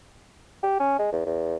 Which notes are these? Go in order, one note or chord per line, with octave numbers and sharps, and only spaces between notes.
G4
C#4
G#3
E2
E2